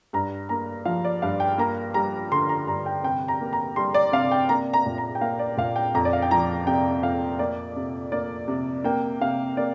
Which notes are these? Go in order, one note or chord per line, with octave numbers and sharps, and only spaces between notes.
G2 A#5
A#3 A#5
F3 F5
D5
G2 F5
G5
A#3 A#5
G3 A#5
D3 C6
A#5
G2 A#5
G5
C3 G5
A#5
A#3
A#5
G3 C6
D5
C3 F5
G5
A#3 A#5
A#5
A#2
A#5
G5
A#3 F5
D5
A#2 F5
G5
F2 A#5
D5
F5
G5
F3 A#5
C3 G5
F2 F5
A#3 D5
C3
A#3 D5
C3
A#3 G5
C3 F5
A#3 D5